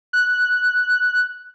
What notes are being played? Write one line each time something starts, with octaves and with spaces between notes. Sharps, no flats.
F#6